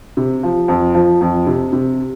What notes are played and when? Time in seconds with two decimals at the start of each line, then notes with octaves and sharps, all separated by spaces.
0.17 C3
0.43 F3
0.68 F2
0.94 F3
1.21 F2
1.47 C3
1.73 C3